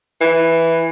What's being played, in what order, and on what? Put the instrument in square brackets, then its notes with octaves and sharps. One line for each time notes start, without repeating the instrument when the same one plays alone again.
[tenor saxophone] E3